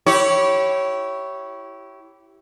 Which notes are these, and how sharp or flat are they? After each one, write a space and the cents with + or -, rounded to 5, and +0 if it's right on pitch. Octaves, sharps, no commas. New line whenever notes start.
E4 +0 G4 -25 C#5 +0